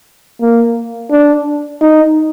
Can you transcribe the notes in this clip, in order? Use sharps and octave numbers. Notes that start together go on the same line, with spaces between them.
A#3
D4
D#4